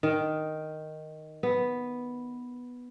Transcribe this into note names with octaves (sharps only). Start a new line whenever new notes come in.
D#3
B3